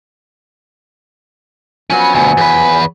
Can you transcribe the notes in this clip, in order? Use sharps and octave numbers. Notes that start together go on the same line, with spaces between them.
F3 F#3 B3 C#4 G#5
D2 B2 G#5
E2 B4